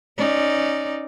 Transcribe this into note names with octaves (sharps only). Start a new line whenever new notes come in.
C#4 D#4 D5